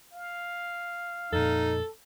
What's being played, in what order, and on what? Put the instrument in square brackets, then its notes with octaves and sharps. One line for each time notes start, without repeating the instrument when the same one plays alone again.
[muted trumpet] F5
[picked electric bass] F2 A#2 [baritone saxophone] D#4 [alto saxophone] A4